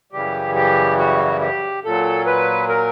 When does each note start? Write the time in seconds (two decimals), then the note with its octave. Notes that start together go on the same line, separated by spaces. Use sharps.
0.12 F#2 C#3 E3 G3 G4
0.55 G4
0.98 F#4
1.41 G4
1.84 A#2 F#3 A4
2.26 B4
2.69 A#4